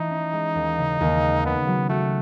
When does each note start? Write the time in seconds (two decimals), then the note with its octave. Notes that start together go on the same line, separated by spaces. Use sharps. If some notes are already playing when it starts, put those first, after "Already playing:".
Already playing: E3 A3 D#4
0.10 C#4
0.33 G#3
0.55 D#2
0.78 C#3
1.01 D#2
1.23 G#3
1.45 C#3 B3
1.67 F#3
1.89 A3 F#4